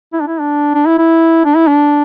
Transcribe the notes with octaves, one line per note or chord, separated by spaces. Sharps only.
E4
D4
E4
D4
D4
E4
E4
D4
E4
D4